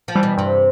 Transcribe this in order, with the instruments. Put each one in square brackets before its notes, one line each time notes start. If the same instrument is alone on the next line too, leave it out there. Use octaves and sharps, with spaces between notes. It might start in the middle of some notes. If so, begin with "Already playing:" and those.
[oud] F3
[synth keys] E3 G3
[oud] B2
[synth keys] G2 [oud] C3